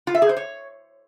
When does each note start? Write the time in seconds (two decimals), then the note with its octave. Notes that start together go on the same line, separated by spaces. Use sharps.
0.07 F4
0.15 E5
0.22 G#4
0.29 C5
0.37 C#5